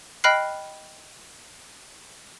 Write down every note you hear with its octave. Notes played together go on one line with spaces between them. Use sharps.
D#5 G5 B5 F6 F#6 C7